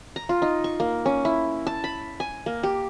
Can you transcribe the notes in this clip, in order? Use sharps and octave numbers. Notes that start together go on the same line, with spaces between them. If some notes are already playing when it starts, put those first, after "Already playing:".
A#5
F4
D#4
C#6
A#3
C#4
E4
A5
B5
G#5
A#3
G4